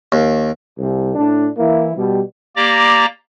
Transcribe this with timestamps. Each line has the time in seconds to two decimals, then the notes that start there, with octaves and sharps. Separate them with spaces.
0.12 D#2
0.78 C2
1.15 A2 D4
1.58 E3 A#3 E4
1.97 B2 G3
2.56 A#3 G4 D5 A#5 D6 A#6